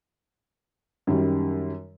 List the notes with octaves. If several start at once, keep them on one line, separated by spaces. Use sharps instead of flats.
F#2 D#3 G3